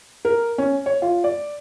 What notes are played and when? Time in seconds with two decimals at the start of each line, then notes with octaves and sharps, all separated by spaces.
0.25 A#4
0.58 C#4
0.86 C#5
1.02 F4
1.24 D5